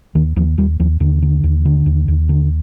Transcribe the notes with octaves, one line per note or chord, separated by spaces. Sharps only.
D#2 D#3
D#2 F3
D#2 G3
D#2 F3
D#2 D3
D3
D#2
D3
D#2
D#2
D3